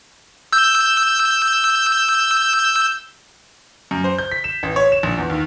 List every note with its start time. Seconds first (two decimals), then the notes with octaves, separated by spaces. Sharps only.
0.53 E6 G6
3.91 F#2
4.04 C5
4.18 G6
4.31 B6
4.44 E7
4.63 A1
4.76 C#5
4.92 E7
5.03 A#1
5.18 E2
5.30 D#2